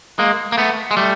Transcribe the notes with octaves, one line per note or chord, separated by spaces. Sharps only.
G#3 A#3
A#3
A3 B3
G#3
G3 A3